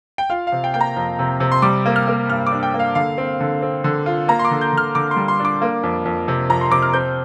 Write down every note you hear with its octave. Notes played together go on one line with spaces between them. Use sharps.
G5
F4 F5
F5
C3
G5
A#3 G5
A#5
F2
C3
C3
C6
G3 D6
A#3
F6
A#3
G2 F6
D4 D6
G5
A#3
F5
D3 F5
C4
D3
C4
D3
F4
A#3 A#5
C6
D6
D3
G6
D3 F6
D3 D6
C6
G3
C6
D4
D6
A#3
F2
F2
C3
F2 A#5
C6
C3 D6
F6
C4 G6